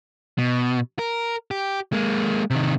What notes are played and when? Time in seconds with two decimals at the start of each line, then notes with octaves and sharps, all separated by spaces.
0.38 B2
0.99 A#4
1.51 G4
1.93 G#3 A#3
2.50 C3 D#3